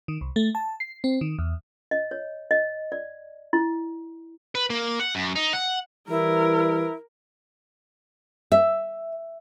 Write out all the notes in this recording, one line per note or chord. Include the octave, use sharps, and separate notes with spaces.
D#3
C2
A3
A5
C7
C4
D#3
E2
D#5
C#5
D#5
D5
E4
B4
A#3
F#5
F#2
D#4
F#5
E3 G3 E4 A#4
E5